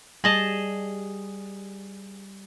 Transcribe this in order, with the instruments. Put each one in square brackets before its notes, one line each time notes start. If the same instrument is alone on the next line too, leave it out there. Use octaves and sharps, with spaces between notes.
[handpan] G3 [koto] G#4 D#5 A5